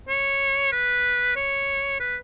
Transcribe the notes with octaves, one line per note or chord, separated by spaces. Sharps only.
C#5
B4
C#5
B4